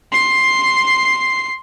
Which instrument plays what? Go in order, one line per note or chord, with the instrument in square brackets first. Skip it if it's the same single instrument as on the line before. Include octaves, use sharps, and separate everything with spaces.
[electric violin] C6 C7